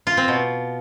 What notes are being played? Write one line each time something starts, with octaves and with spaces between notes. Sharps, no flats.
F4
C4
B2